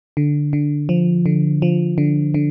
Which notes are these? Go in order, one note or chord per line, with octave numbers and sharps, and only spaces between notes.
D3
D3
F3
D3
F3
D3
D3